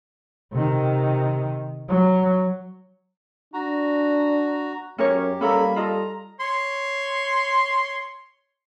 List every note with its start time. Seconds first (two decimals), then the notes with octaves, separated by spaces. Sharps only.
0.52 C3 D#3
1.89 F#3
3.54 D4 F#4 A#5
4.98 F#2 C#4 G4 A#4 C#5
5.41 G3 A#3 C#4 A4 A#5 B5
5.76 F4 A4 D#5 A#5
6.40 C#5 C6